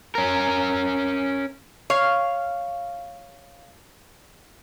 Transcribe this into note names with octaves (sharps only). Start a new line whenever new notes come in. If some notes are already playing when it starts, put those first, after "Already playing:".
C#4 A#4
C#5 F5